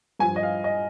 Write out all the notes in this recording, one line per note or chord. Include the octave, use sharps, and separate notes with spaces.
G2 F3 G#5
D#5
F5
D#5